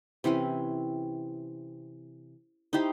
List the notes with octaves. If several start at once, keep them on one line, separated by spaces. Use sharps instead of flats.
C3 E3 C4 C#4
D#4 E4 G4 C5